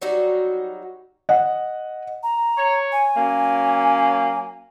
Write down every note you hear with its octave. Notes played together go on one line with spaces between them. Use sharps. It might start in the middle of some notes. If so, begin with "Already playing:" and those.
F#3 G3 D#4 F#4
D#5 F#5
A#5
C#5
G#5
F#3 A#3 C#4